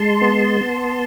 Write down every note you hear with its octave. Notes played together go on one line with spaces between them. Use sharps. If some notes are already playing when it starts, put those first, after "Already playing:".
Already playing: G#3 A5 C6
B3
B3